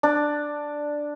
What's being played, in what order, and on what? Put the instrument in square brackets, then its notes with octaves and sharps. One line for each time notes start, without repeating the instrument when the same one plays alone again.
[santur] D4